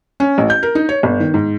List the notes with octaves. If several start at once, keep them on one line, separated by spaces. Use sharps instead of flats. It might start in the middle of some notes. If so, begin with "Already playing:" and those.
C#4
A1
G6
A#4
D#4
C#5
G1
D#3
G#2